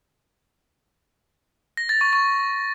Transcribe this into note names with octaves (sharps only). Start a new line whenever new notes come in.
A#6
A6
C#6
C#6